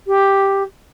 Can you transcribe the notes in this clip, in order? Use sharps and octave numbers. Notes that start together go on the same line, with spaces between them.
G4